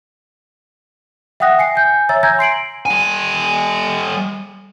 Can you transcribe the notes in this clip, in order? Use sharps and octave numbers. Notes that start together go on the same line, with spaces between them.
E5 F#5 G5 D#6 F#6 A#6
G#5 C7 C#7
G#5 G6
C#5 E5 A#5 E6 A6
G#5 A#5 E6 G6 G#6 A#6
C6 C7 D7 F#7
G3 G#5